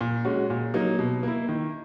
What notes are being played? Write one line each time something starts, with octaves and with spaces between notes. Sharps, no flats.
A#2
G#3 C#4 F#4
A#2
F#3 A#3 D#4
B2
A#3 E4
D#3